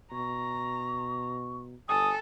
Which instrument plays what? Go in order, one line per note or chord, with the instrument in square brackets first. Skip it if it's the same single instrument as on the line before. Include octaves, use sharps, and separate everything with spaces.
[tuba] B2 [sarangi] A#5 [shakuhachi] C#6
[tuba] G1 [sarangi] A4 [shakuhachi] G#5 [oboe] D#6